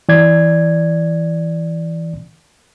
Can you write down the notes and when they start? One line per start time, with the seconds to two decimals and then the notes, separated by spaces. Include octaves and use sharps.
0.09 E3 D5 G#6